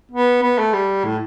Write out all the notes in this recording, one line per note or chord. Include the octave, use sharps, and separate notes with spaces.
B3
B3
A3
G3
A2